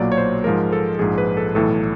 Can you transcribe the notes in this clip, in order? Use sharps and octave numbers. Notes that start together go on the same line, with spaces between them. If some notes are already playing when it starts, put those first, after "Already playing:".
Already playing: B1 A#2 F#3 A#3 D5
C#5
C5
G#2 F3 G#3 A#4
A4
A#1 G#2 F3 G#4
B4
A4
B1 A2 E3 A4